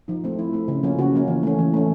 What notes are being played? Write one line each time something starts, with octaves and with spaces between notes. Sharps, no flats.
F3 D#4
A3 C4
F3 E4
A3 C4
C#3
F3 A#3 C#4
C#3 F#4
F3 A#3 C#4
E3
A3 C#4
E3
A3 C#4